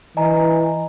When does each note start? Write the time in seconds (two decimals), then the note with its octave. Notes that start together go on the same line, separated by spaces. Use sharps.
0.17 E3 D#5 G#5 A#5